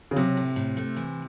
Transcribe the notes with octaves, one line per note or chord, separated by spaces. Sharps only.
C#3
C3 F#3
A2
A2
A3
E3